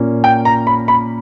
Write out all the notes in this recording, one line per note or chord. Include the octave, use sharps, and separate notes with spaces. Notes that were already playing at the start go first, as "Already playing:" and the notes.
Already playing: A#2 A#3 C#4
G5
A#5
B5
B5